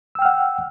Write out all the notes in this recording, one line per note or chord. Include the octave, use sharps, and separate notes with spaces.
F#5 G5 E6 F6